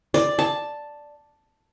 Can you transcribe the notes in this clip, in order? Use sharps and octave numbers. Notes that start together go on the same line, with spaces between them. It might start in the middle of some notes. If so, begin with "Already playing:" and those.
D5
A5